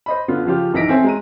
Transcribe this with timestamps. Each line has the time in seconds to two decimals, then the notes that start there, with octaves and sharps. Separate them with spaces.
0.06 C5 D#5 B5
0.28 D3 B3 F4
0.45 C#3 F3 F4 G4
0.74 A#1 E3 D#4 A#6 B6 D7
0.89 C4 C#4 A4 C#5 E5 G#5
1.04 G#3 A#5 D#7